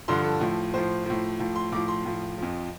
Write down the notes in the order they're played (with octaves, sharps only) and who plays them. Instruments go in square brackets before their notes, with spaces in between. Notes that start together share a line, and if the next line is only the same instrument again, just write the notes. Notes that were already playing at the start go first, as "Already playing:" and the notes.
[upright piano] G2 D3 F3 C6
A4
A2 F3
A2 F3 C5
A2 F3
A2 F3
C6
A2 F3 D6
C6
A2 F3
F2 F3